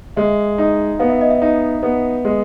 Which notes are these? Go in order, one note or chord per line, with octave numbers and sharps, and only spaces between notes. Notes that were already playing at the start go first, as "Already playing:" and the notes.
G#3 E5
D#4
B3 F5
E5
D#5
E5
D#4
B3
G#3